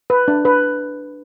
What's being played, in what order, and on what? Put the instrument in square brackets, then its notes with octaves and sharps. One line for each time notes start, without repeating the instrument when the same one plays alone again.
[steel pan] B4
D4
B4